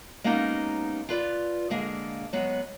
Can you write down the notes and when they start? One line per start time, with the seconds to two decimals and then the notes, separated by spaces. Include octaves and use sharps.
0.24 G#3 A#3 B3 C#4 D#4 G4
1.09 F4 B4 D5
1.70 D3 G#3 A#3 G#4
2.33 F#3 G#3 B3